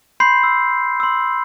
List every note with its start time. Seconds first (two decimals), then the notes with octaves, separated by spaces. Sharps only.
0.20 B5 C6 G6 C7
0.43 E6
1.00 C6 E6